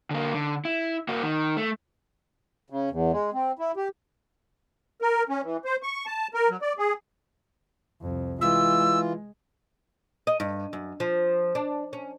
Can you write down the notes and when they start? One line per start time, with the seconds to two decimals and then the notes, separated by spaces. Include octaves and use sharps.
0.11 D3 A#3
0.34 D3
0.65 E4
1.09 A#3 F#4
1.23 D#3
1.57 A3
2.70 C#3
2.90 E2
3.12 G#3
3.34 C4
3.59 E4
3.77 G4
5.02 A#4
5.29 C#4
5.44 E3
5.65 C5
5.83 C#6
6.06 A5
6.34 A#4
6.50 F#3
6.62 D5
6.78 G#4
8.02 C2 F2
8.41 E3 G#3 F4 E6
10.27 D#5
10.40 G2
10.73 F#2
11.00 F3
11.55 D4
11.93 C#4